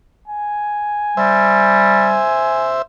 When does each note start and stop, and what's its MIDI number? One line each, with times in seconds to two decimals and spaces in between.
0.28 2.72 80
1.17 2.23 55
1.17 2.82 72
1.17 2.82 76